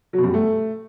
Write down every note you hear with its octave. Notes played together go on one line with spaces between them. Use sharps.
F#3
B2
F#2
G3
A3